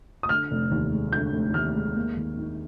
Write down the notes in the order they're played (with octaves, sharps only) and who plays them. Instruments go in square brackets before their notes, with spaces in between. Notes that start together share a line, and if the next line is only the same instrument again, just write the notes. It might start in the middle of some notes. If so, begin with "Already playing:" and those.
[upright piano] D#6
D3 F6
F1
D#2
G#3
D3 G6
F1
D#2 F6
G#3
A#3
D#2
D#3